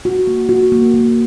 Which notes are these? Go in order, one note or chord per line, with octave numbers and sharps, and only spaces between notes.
F#4
A#3
F#4
A#3
A#3